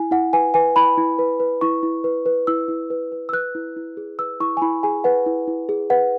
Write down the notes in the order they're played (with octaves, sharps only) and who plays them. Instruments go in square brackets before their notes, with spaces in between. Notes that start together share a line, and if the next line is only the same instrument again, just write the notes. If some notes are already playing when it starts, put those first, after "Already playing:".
Already playing: [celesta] E4 G#5
E4 F#5
B4 G#5
B4 G#5
E4 B5
E4
B4
B4
E4 C#6
E4
B4
B4
E4 E6
E4
B4
B4
E6
B4 F#6
E4
E4
G#4
B4 E6
E4 C#6
G#5
E4 B5
G#4 G#5
B4 F#5
E4
E4
G#4
B4 F#5